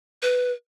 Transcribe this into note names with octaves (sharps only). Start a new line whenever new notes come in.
B4